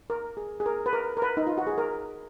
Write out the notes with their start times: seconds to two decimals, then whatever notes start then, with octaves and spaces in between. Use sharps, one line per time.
0.10 A#4
0.37 G#4
0.60 G#4
0.66 A#4
0.86 B4
0.93 A#4
1.17 A#4
1.22 B4
1.37 D#4
1.47 F4
1.58 F#4
1.67 G#4
1.78 A#4